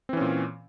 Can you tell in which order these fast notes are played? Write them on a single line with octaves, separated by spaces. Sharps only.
C4 E3 C#4 A#2